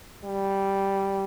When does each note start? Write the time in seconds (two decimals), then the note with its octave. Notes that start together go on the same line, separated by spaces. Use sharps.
0.24 G3